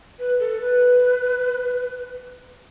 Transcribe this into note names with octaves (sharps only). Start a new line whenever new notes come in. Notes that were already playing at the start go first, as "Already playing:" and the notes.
B4
A4
B4